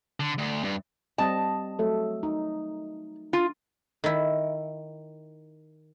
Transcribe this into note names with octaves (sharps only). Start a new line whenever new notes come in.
D3
D2
G2
G3 C4 D#5 A5
F#3 A3 A4
D#4
F4
D#3 E4